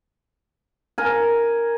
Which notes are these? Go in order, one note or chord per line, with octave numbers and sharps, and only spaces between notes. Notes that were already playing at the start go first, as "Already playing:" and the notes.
A#4 G#5